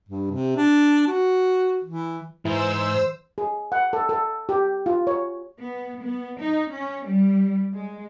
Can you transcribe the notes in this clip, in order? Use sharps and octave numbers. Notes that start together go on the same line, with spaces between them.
G2
C3
D4
F#4
E3
G#2 E3 C5 E6
G#4
F#5
A4
A4
G4
F4
C#5
B3
B3
D#4
C#4
G3
G#3